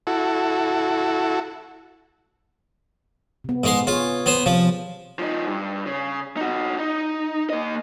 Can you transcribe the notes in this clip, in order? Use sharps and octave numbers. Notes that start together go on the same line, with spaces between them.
E4 F#4 A4
C3 B3
G#2 G#3 C6
F4 G#4 C#5
B3 C5
C3 F3
F3 D#4
G2
C#3
D#4 F#4
D#4
A#3 D#5